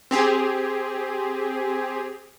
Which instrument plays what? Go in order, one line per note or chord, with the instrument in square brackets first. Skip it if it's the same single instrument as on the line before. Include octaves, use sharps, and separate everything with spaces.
[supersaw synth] C4 G4 G#4